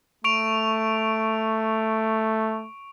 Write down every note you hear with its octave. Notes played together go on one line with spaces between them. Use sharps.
A3 C#6 D7 F7